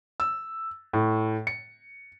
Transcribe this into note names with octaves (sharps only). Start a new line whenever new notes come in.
E6
A2
C#7